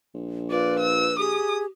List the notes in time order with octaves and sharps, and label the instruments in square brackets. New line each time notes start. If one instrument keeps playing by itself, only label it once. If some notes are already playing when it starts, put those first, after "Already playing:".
[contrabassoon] A#1
[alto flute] F4 [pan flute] B4 [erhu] D5
[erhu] E6
[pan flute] G4 [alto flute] G#4 [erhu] D#6